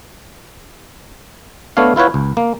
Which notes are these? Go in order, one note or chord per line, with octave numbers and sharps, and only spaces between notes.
A3 B3 D4 C#5 F5
E4 F4 B4 C#5 F#5
C#2
A#3